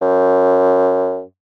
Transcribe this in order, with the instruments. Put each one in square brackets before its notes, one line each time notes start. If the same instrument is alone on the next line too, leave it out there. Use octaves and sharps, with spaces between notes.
[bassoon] F#2